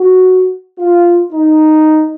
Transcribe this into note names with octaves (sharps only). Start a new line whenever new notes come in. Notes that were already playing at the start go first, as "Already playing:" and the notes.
Already playing: F#4
F4
D#4